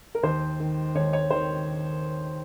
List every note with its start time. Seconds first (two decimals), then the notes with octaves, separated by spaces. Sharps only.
0.15 A#4
0.23 D#2 C5
0.60 D#3
0.95 D#2 C#5
1.13 C#5
1.31 D#3 C5